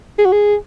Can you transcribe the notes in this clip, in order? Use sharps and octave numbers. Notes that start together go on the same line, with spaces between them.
G#4
F#4
G#4